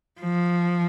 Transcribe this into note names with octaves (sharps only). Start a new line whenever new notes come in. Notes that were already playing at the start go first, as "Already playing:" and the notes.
F3